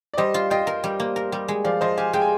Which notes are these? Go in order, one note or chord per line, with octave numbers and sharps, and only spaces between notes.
D5
G3 C5 D#5
F4
F4 D#5 G5
A#4
G3
A#3
A#4
G3
G#3
F3 D5 F5
F3 C5 D#5
G4 F5 G#5
G#3 G5
G#5